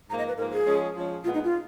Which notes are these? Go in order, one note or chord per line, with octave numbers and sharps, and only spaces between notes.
G#2 F3 A#3 A#5
D#5
B4
G#2 F3 A#3 A#4
G#4
F3 G#3 C#4
F3 G#3 C#4
A#2 G#3 B3 F4
D#4
F4